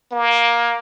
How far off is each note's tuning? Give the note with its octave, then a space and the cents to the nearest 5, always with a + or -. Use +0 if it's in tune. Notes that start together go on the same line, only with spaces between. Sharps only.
A#3 +15